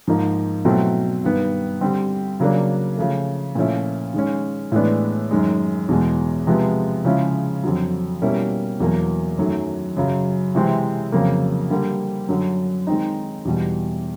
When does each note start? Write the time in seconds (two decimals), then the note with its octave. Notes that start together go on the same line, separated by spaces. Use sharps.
0.07 G#2 F3 A#3 D#4
0.65 B2 F#3 A3 C4 E4
1.23 G2 D#3 G3 B3
1.81 D3 G3 C4
2.40 C#3 F#3 A#3 D4
2.97 C#3 F3 A3
3.55 A#2 F3 A3 C#4 E4
4.14 D#3 G#3 C#4
4.72 A2 E3 G#3 B3 D4
5.31 F#2 D#3 G#3
5.89 E2 B2 G#3
6.47 C3 F3 G#3 B3
7.05 C#3 F3 G#3 C#4 E4
7.63 F2 D3 F#3
8.22 B2 G3 A#3 C#4 E4
8.80 E2 B2 F#3 A#3
9.38 F#2 D#3 F#3 A3
9.97 F#2 C#3 F#3
10.55 C3 E3 G#3 C4 E4
11.12 F2 C#3 F#3 A#3
11.70 D3 G3 A#3
12.29 F#2 D3 F#3
12.87 D#3 G#3 C4 D#4
13.45 E2 B2 G3